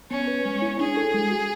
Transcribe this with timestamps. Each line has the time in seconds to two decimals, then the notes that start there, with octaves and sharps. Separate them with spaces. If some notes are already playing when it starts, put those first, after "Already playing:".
0.11 B3 C#4
0.27 B4
0.45 G#3
0.62 E4
0.80 D4 G#4
0.97 A4
1.14 G#3
1.30 F#4